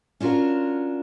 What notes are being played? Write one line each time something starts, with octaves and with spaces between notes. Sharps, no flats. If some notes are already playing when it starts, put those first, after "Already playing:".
C#4 D4 F4 F#4 A#4